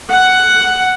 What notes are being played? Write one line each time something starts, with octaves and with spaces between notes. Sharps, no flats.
F#5